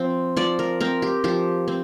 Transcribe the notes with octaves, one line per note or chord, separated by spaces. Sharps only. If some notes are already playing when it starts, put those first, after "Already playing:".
Already playing: F3 C4
F3 D5
A#4
C4 A#4
G4
F3 G4
C4